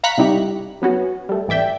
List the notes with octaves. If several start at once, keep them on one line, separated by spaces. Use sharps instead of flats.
F5 A#5 B5 C#6 F#6 B6
C3 G3 D#4 E4 G4
F#3 B3 C#4 F#4
G3 A3
G#1 E3 D5 E5 G5